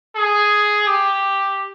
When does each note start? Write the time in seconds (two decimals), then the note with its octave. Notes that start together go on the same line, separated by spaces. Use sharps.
0.16 G#4
0.87 G4